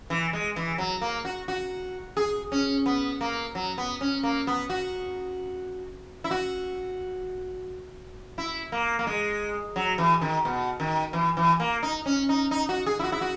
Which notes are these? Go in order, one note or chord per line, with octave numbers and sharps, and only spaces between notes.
E3
G#3
E3
F#3
A#3
F#4
F#4
G#4
C#4
B3
A#3
F#3
B3
C#4
A#3
B3
F#4
E4
F#4
E4
A#3
A#3
G#3
F#3
E3
D#3
B2
D#3
E3
E3
A#3
D#4
C#4
D#4
D#4
F#4
G#4
E4
F#4
E4
F#4